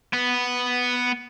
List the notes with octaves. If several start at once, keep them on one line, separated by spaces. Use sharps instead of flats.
B3